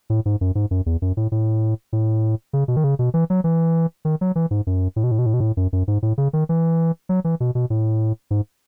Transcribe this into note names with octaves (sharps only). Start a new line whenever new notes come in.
A2
G#2
F#2
G#2
F#2
E2
F#2
A2
A2
A2
C#3
B2
D#3
C#3
B2
E3
F#3
E3
D#3
F#3
E3
G#2
F#2
A2
B2
A2
B2
A2
B2
A2
F#2
F#2
G#2
A2
C#3
D#3
E3
F#3
E3
B2
B2
A2
G#2